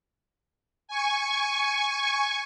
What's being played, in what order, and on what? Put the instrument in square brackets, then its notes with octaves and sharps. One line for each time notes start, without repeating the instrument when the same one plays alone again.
[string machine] G#5 C#6